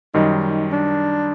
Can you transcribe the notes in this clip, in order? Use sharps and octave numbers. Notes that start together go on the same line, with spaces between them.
F#2 D#3 G3 D#4
D#4
D4